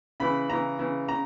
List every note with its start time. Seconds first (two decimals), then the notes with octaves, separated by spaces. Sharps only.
0.20 C#3 E3 B5
0.49 C#3 E3 A#5
0.79 C#3 E3
1.08 C#3 A#5